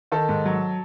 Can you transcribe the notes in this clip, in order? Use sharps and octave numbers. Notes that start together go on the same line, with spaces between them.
D#3 A4
G#2
F#3